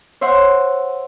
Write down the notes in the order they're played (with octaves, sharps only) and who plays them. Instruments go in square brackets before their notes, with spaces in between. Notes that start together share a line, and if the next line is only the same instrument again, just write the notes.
[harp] C5 C#5 E5 F#5 C6